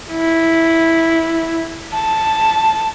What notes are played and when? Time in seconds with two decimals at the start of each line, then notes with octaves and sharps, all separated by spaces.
0.12 E4
1.94 A5